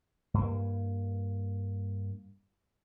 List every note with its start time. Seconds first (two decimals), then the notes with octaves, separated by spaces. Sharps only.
0.34 G2 A#3